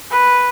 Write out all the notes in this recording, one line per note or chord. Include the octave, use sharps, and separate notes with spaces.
B4